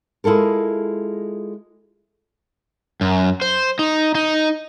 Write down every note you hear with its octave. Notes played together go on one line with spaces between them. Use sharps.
G#3 E4 F4 A4 A#4
F#2
C5
D#4
D#4